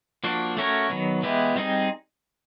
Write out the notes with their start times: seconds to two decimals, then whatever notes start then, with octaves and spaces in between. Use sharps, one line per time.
0.24 F3 A#3 D4 F#4
0.57 A3 C#4 F#4 A#4 C#5
0.90 D#3 F#3 B3
1.22 E3 G#3 B3 E4 G4
1.56 G3 C4 D#4 G#4